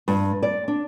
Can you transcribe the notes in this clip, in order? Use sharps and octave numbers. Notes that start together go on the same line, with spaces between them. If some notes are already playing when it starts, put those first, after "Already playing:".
G2
D5
D4